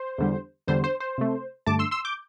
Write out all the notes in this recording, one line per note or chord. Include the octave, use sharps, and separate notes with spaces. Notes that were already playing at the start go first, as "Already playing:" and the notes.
Already playing: C5
E2 D3 G3
E2 D3 G3 C5
C5
C5
C3 A3
G2 D3 A3 A5 D6
C6 E6
C6 E6
D6 G6